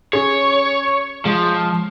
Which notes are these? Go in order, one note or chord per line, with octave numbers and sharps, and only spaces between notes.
C#4 G#4 C#5
F3 G#3